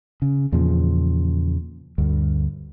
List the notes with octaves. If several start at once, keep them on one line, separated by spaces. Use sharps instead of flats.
C#3
E2 A#2 C#3 F3
D2 G2